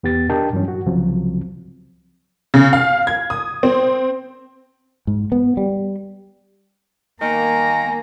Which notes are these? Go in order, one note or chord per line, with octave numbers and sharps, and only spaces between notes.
E2 B3 G4 A6
D4 G4 A#4 D#5 G5 A5
G2 E3 F#3 C#4
F#4
C2 C#3 F3 F#3 C4
C#3
F5
G#6
D#6
C4
G#2
B3
G3
D#3 A#3 G#5 A#5